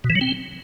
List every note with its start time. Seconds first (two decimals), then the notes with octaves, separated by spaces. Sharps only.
0.04 B2
0.10 E3
0.15 F#3
0.21 C4